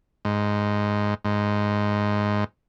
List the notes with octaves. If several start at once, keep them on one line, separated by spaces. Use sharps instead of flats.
G#2
G#2